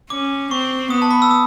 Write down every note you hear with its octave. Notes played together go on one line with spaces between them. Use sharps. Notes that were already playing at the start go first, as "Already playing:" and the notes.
C#4 D6
C4 C#6
B3 D#6
A5
B5
E6
D#6